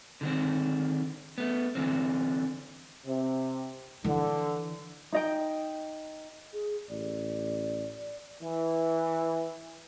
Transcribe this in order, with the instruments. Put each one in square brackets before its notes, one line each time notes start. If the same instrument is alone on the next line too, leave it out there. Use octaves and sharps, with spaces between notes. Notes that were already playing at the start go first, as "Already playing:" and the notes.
[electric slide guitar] D3 D#3 C4
A3 B3
D3 E3 C4
[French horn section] C3
[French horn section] D3 [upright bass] E3
[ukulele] D#4 D#5 G5
[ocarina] G#4
[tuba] A1 [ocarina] D5
[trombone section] E3